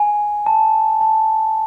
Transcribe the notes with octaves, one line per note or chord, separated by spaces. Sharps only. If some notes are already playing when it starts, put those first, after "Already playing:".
Already playing: G#5
A5
A5